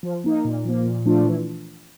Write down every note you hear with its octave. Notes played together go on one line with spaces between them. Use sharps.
F3
A#3 D#4
A#2
F3 A#3
A#2
F3 A3 D4 F4
E3